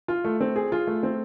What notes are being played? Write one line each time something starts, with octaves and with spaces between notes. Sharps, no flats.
F4
A3
C4
G#4
F4
A3
C4